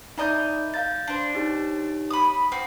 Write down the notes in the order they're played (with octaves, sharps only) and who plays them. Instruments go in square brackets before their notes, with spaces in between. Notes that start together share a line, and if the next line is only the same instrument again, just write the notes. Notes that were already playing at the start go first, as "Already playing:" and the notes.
[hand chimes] D#4 D5 G6 [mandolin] E4 A#4 D#5
[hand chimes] F5 G6 A6
[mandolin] D4 C5
[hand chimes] D#4 G4 C#5
[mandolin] B5 D#6
C4 F#4